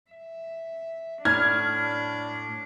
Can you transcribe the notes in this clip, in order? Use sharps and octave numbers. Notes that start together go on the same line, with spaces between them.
E5
A2 D4 F6 G#6